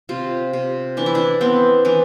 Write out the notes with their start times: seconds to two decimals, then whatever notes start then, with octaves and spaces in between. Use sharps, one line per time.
0.09 C3 F4
0.53 C3
0.97 E3 D4
1.06 E4
1.15 D4
1.41 B3 C4
1.85 E3 D4